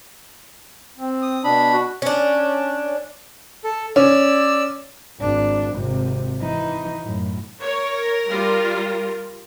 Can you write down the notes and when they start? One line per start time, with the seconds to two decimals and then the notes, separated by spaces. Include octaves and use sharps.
0.98 C4
1.22 D#6
1.44 B2 D4 B5
1.72 F#4
2.02 C#4 D4
3.64 A4
3.96 C#4 D5 E6
5.19 G#1 D4
5.74 G#1 C3
6.40 E3 D#4
7.03 F#2 A2
7.62 A#4 C#5
8.30 G3 F4